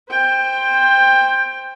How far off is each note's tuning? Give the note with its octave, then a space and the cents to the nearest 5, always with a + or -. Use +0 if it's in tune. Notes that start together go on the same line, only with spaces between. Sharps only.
C5 +0 G5 +15